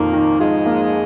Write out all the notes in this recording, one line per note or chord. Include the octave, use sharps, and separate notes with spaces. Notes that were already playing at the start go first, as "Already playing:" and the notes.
Already playing: F2 A#2 D#3 A#3
D#3
G#2 G#3 F4
A#3